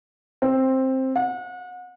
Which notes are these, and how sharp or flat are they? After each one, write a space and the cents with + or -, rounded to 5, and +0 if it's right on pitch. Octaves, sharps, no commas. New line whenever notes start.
C4 +10
F#5 -35